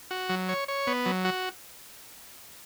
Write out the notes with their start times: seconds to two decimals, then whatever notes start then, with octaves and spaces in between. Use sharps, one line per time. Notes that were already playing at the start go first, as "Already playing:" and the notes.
0.11 F#4
0.29 F#3
0.49 C#5
0.68 C#5
0.87 B3
1.06 F#3
1.25 F#4